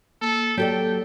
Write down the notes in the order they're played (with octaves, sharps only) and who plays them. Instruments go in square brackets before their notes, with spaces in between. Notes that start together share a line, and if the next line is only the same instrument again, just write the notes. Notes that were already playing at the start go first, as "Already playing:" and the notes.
[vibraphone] A#3 [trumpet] A4
[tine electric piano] F#3 [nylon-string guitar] G4 A4 D5 [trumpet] G5